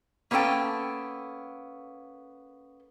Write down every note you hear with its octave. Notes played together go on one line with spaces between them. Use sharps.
A#3 B3 C#4 A4 G5